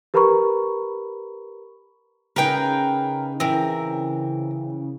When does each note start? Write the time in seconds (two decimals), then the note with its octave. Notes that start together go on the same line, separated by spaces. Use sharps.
0.14 G4 A#4 B4 A#5 B5 C#6
2.36 C#3 D#4 G#4 A#4 B4 G5
3.40 E3 C4 A#4